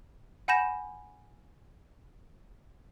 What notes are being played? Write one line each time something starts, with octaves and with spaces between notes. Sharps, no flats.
F#5 G#5 B5 G6 A#6 E7